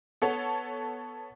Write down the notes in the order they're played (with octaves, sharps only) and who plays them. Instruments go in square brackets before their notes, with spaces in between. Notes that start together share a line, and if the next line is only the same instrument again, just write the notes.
[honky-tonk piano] B3 A4 C#5